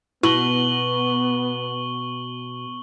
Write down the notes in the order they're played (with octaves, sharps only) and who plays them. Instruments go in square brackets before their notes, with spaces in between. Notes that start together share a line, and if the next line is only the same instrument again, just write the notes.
[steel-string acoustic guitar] B2 [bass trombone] B3 [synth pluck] E4 [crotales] C#6 F#7 G7